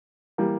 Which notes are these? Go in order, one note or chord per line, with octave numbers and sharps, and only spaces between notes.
E3 G3 A#3